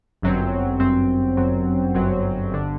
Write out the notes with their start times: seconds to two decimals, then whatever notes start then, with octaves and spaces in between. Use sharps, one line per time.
0.22 G1 F#2 F#3 C4
0.80 G1 F#2 F#3 C4
1.37 G1 F#2 F#3 C4
1.94 G1 F#2 F#3 C4
2.52 G1 D3